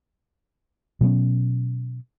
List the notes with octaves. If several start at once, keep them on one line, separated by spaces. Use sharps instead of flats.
B2 F#3 B3 C#4